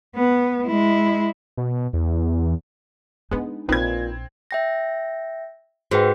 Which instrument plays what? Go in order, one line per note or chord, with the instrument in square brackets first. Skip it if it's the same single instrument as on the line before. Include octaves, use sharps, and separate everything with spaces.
[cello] B3
G#3 E4
[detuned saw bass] B2
E2
[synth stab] G#3 B3 [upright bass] D4 D#4
[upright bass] A#1 [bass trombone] A#2 [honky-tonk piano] C4 G#6 [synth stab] D#4 B4
[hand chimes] E5 G5 A#6
[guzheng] G#2 [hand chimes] F#4 B4 G5